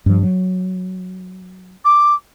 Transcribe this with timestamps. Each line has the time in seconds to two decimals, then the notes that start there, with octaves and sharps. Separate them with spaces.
0.06 G2 F3
0.23 F#3
1.85 D6